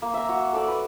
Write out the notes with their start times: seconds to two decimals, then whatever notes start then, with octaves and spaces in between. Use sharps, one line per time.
0.02 A#3
0.14 E5 A#5
0.29 F#4
0.53 A4 D5 A5
0.68 B4